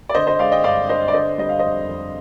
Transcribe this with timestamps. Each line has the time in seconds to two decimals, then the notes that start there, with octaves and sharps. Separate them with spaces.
0.09 D5
0.14 D3 C5 D#5
0.27 C5 D#5
0.39 G#3 D5 F5
0.52 D#5 G5
0.64 G2 D5 F5
0.89 D4 C5 D#5
1.08 D5
1.13 D3 C5 D#5
1.38 G3 D#5
1.49 F5
1.59 F2 C5 D#5
1.88 F2